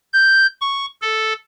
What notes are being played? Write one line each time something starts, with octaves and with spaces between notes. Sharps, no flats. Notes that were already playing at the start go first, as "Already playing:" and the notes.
G6
C#6
A4